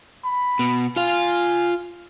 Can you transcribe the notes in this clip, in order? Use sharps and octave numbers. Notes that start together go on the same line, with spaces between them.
B5
B2
F4 F5 G#5